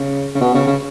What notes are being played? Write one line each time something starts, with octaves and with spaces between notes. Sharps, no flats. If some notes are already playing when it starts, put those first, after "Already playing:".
Already playing: C#3
C#3
B2
C#3
C#3